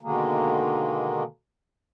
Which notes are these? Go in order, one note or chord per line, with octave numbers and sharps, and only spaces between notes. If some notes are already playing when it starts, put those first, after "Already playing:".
B2 D3 D#3 G#3 A#3